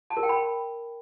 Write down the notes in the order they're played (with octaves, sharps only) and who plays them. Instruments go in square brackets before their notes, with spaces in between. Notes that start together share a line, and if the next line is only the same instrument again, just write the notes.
[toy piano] A5
A#4
G5
B5